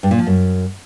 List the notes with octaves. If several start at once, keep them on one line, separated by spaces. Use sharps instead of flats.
G2
A#2
F3
F#2